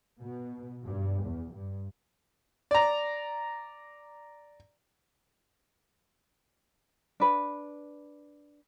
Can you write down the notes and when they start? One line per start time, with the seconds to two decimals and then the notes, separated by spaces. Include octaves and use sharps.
0.21 B2
0.84 G2
1.23 E2
1.52 G2
2.71 D5 A#5
7.20 D4 B4